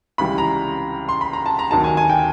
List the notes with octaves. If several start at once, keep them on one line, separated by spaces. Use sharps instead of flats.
C#2 C3 E3 G3 B5
A#5
C6
B5
A#5
A5
A#5
D2 C3 D#3 F#3 A5
G#5
G#5
G5